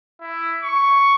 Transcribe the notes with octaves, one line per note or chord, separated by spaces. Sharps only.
E4
C#6